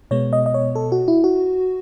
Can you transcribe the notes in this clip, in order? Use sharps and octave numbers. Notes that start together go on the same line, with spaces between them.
B2 G#3 B3 C#5
D#5
D#5
C#5
A4
F#4
E4
F#4